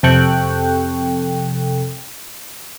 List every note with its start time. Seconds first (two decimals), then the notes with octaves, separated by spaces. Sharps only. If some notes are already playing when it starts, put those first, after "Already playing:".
0.03 F2 C3 A4 G5 C#6 F#6